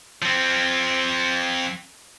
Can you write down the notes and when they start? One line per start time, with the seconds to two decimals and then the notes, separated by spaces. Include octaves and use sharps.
0.22 F3 C4